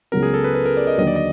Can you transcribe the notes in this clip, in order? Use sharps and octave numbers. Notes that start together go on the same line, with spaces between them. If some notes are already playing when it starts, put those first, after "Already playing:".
C#2 C#3 F#3 B3 A#4
G#4
A4
B4
B4
A#4
D5
D#5
D#2 D3 F#3 D#5
D5
D#5